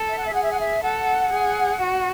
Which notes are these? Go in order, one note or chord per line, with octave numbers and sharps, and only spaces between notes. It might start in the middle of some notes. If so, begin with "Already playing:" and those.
Already playing: A4
E5
F#5
E5
G#4 F#5
E5
F#5
E5
A4 F#5
G#4
F#4